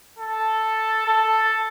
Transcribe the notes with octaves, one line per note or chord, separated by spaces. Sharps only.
A4
A4